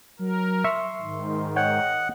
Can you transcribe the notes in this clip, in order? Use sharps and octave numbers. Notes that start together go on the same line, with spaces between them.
F#3 A#4
E5 C6 C#6
G#2 D#3
C#5 D#5 F#5 G5